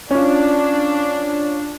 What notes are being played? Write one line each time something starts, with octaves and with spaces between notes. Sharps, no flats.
C#4 D4 F4